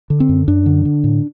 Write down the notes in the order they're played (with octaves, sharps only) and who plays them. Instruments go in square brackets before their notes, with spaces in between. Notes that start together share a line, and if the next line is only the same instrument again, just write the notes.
[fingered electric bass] D3
C4
F#2
F#2 D4
D3
D3
A2